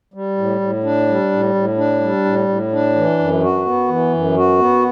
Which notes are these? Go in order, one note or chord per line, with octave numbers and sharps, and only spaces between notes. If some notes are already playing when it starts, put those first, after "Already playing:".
G3
A2
A2
D4
G3
A2
A2
D4
G3
A2
A2
D4
E3
F#2
F#4
B3
E3
F#2
F#4
B3